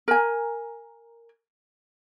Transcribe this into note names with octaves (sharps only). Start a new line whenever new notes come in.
A#4 G#5